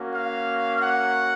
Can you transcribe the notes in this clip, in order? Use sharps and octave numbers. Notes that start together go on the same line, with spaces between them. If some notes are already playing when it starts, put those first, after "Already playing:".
Already playing: A#3 C#4 F#4
F5
F#5